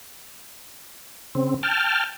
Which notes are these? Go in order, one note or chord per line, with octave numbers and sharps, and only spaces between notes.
C#3 C4
G5 A5 F6